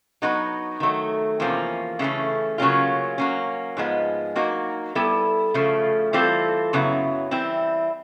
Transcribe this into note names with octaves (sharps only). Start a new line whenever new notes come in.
F#3 B3 D#4 F#4 B4
D#3 F#3 A3
E2 C3 F3 A#3 C#4
C#3 E3 A3 C#4
C#3 F#3 A#3 C#4 F4
F#3 A#3 C#4
G#2 F3 G#3 B3
F#3 A#3 D#4 F#4
G3 B3 E4 A4
C#3 F3 A3
E3 G3 C4 F4 A4
F#2 C#3 F#3 B3 E4
E3 G3 C4 E4